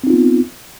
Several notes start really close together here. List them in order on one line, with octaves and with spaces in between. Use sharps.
C4 D#4 F4 B3